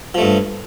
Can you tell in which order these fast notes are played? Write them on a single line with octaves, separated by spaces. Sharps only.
F3 A3 G2